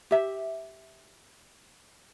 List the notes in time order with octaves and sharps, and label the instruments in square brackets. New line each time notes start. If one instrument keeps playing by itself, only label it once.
[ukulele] G4 E5